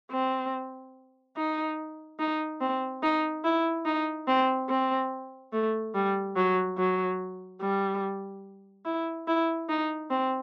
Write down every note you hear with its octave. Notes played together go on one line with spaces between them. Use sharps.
C4
D#4
D#4
C4
D#4
E4
D#4
C4
C4
A3
G3
F#3
F#3
G3
E4
E4
D#4
C4